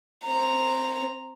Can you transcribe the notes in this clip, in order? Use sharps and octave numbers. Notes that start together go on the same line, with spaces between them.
C4 A#5